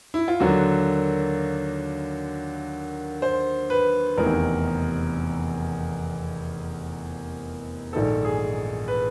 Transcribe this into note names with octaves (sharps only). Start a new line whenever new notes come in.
E4
F4
D#2 D3 F#3 A#3 F#4
C5
B4
F1 E2 C3 D#3 A#4
A#1 G#2 D#3 A4
G#4
B4